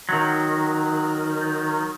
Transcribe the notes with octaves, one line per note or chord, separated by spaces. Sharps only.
D#3 F#3